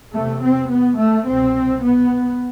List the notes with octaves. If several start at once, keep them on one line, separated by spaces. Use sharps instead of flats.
E2 C3 A3
C4
B3
A3
C2 B2 C4
B3